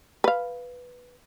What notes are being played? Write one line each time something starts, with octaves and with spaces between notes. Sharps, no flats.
B4 F5